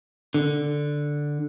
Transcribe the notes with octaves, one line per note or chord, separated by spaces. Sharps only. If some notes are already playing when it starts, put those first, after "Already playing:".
D3